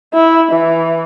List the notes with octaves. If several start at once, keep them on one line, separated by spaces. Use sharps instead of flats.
E4
E3